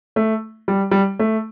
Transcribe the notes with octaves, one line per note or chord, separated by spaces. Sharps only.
A3
G3
G3
A3